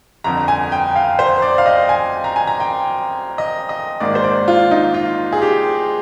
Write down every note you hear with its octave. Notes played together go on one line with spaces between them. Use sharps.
G1 F2 D3 A#5
G#5
G5
F5
C5
D5
F5
D#5
G#5
A#5
G#5
A#5
G5
D#5
D#5
G#1 G#2 D#3 A#3 D5
C5
D5
F4
D#4
F4
G#4
G4